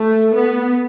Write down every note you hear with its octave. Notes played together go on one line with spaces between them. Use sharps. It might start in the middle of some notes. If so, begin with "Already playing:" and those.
Already playing: A3
B3